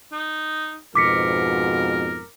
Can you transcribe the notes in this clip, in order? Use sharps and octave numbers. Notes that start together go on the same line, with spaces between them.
D#4
F2 G#2 B2 A#4 D6 B6 C#7